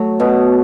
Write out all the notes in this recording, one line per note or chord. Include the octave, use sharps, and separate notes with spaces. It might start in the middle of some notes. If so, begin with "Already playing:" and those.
Already playing: F#3 A3
B2 B3